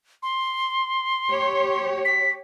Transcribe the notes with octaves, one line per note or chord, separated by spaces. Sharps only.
C6
G4 C#5
B6